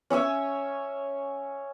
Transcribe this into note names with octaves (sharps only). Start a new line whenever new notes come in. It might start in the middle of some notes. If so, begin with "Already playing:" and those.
C#4 C#5 E5 G#5